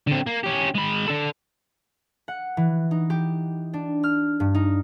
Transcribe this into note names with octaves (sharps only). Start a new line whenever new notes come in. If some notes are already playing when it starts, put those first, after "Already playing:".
D3 C4
A#3
C#4 G4
G#3 B5
D4 A4
F#5
E3
D#4
G4
D4
F6
G2
D#4